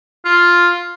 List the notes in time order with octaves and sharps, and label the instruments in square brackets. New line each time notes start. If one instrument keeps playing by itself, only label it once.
[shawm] F4